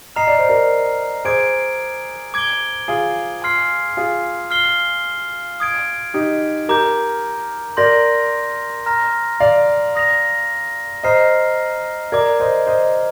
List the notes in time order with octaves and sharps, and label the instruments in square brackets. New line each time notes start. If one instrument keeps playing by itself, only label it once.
[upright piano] D#5 [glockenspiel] A#5 F6 C7 F7
[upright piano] D5
C5
A#4 D5
[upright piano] G#4 C5 [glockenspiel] D6 G#6 D7
[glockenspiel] D6 G#6 D7 G7
[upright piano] F4 G#4
[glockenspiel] G#5 C6 F6 C7
[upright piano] F4 G#4
[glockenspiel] F6 C7 G7
D#6 G#6 D7
[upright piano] D#4 G4
[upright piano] G4 A#4 [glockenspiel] A#5 D6 G6
[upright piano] A#4 D5 [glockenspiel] C6 G6 A#6
[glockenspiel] A#5 F6 A#6
[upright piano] D5 F5
[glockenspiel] D#6 A#6 F7
[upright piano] C5 D#5 [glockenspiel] A#5 F6 C7
[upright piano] A#4 D5 [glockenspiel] A#5 D6 G#6
[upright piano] C5 D#5
C5 D#5